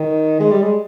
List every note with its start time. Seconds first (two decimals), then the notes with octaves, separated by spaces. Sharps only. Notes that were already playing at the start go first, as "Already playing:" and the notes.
Already playing: D#3
0.40 G#3
0.51 G3
0.62 G#3